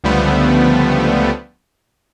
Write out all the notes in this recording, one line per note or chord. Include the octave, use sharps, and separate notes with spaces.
C#2 D3 F3 G3 A3 B3